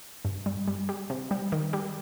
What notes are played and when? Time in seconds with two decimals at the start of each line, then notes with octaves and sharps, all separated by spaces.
0.25 G2
0.46 G3
0.68 G3
0.89 G3
1.10 C3
1.31 G3
1.52 D#3
1.73 G3